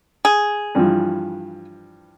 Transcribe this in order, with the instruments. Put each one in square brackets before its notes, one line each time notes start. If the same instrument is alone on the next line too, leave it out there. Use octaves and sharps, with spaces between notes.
[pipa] G#4
[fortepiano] G2 E3 F3